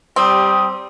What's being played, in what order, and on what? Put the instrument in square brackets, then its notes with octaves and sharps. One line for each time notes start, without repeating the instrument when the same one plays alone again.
[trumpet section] G3 G4 D#6 [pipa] C4